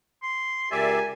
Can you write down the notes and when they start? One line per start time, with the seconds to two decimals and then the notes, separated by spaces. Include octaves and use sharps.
0.23 C6
0.71 C#2 G4 A#4 D5 E5 G#5